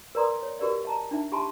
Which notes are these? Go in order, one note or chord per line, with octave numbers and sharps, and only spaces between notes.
A#4 B4 D5 A#5 C6 D#6
C#5
F#4 G4 A#4 B4 D5 D#5
D#5 A5 A#5
D4 D#4 E5
G4 E5 G#5 A5 B5 C6